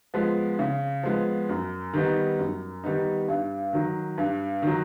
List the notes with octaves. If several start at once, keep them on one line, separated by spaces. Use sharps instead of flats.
F3 G#3 B3
C#3
F3 G#3 B3
F#2
D#3 G3 B3 D#4
F#2
D#3 G3 B3 D#4
G2
D#3 F#3
G2
D#3 F#3